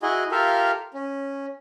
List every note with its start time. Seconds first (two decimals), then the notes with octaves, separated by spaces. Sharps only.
0.03 E4 F#4 G#4 D#5 G#5
0.31 F4 G4 A4 A#4 E5 F5
0.94 C#4